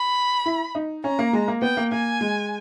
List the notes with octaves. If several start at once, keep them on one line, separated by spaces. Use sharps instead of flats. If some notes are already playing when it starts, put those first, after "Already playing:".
Already playing: B5
E4
D#4
C#4 A#5
A#3
G#3
A#3
B3 G5
A#3
A#3 G#5
G#3